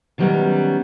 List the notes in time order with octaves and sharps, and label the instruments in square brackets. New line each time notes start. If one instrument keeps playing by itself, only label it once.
[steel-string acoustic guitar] D3 D#3 F#3 G3 B3 C#4